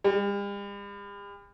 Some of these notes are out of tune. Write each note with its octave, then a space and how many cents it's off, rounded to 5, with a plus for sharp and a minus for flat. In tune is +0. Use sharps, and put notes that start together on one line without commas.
G3 +45